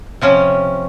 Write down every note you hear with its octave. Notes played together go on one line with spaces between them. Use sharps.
C3 F3 C#4